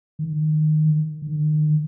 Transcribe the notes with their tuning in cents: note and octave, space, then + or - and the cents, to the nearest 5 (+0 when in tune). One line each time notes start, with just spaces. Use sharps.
D#3 -15
D#3 -35